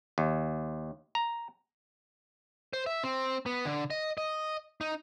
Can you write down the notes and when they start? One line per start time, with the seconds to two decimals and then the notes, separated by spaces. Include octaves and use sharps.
0.18 D#2
1.15 A#5
2.73 C5
2.87 E5
3.04 C4
3.46 B3
3.65 D3
3.91 D#5
4.18 D#5
4.81 D#4